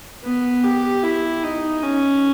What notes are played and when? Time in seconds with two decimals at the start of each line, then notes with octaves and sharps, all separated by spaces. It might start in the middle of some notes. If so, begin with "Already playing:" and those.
0.24 B3
0.64 G4
1.03 E4
1.43 D#4
1.83 C#4